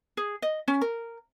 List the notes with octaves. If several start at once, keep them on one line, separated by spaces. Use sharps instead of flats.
G#4
D#5
C#4
A#4